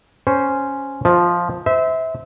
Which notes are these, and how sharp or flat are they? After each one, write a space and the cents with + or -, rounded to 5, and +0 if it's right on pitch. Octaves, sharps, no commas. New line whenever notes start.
C#4 +0 C5 +0
F3 +0 D#5 +30
C5 -25 E5 -25